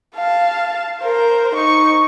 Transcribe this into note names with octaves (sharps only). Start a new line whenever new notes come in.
F5 A5
A#4 C5
D#4 C#6